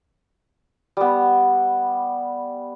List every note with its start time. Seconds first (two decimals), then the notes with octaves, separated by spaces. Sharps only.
0.97 G3 B3